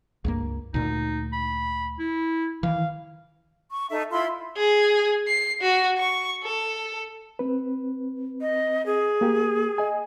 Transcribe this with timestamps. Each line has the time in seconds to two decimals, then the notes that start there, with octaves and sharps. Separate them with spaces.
0.24 C#2 G2 A#3
0.74 D2 A#2 D#4
1.32 B5
1.99 E4
2.63 D#3 E3 F5
3.71 C#6
3.90 D#4 A4 E5
4.11 E4 F4 B5 C6
4.57 G#4
5.28 C7
5.62 F#4
5.99 C#6
6.44 A4
7.39 C4 B4
8.41 D#5
8.86 G#4
9.21 A#3 G4
9.78 D#5 G#5